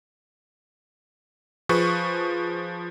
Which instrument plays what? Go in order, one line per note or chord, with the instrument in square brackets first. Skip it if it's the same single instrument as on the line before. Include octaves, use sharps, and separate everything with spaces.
[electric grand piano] F3 G#4 B4 C#6